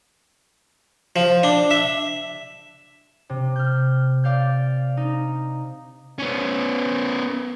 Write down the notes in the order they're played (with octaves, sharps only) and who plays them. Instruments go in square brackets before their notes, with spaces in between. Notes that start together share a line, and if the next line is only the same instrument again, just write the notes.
[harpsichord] F3
D4
E5
[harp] C3
F6 G6
D5 F5 G6
D#4
[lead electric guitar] B3 C#4